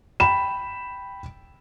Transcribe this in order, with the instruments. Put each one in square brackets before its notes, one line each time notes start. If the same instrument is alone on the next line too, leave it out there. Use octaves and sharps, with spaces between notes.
[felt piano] G5 B5 E7